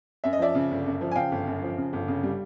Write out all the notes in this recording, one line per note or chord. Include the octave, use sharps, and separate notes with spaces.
F#2 E5
D#5
F3 D5 E5
C#3
G1
F#2
F3
G#5
C#3 F5 G5
G1
F#2
F3
C#3
G1
C#3
G3